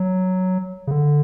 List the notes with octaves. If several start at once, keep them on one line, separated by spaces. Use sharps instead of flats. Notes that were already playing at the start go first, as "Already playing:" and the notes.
Already playing: F#3
C#3
D3